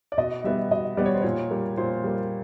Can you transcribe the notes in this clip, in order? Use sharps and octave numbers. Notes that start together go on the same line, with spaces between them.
D5
B2 D#5
G3 B3 E5
B2 D#5
G3 B3 D5
C#5
C5
A#2 C#5
G3 A#3
A#2 C5
G3 A#3